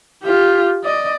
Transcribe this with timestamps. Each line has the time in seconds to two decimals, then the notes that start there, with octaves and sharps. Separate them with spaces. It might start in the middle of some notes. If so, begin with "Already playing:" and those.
0.24 F4 G4
0.84 D5 D#5